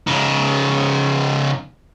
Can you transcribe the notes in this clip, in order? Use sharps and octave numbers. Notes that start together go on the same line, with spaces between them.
C#3 D#4